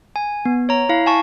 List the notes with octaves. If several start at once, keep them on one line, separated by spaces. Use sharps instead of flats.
G#5
B3
C#5 A#5
E4 F5
G#5 A5 C#6